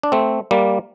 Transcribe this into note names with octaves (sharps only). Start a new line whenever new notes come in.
D4
A3 C4
G3 A#3